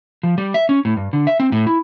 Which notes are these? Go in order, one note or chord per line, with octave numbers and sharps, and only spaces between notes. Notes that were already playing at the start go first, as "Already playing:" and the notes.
F3
G3
E5
C#4
A2
G2
D3
E5
C4
A2
E4